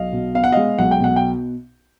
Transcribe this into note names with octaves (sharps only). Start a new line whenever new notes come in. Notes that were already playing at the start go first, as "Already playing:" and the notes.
Already playing: B1 D#5 F5
B2
B3 F5
F#5
G#3 D#5 F5
B1 F#5
G5
B2 F#5
G5